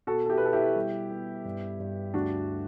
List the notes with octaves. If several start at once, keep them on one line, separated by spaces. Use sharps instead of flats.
B2 F#4 A4
A4
E4 G4
B4
B2 A4
E4 G4
G3
B3
G2
G2
D2 D4 F#4
D3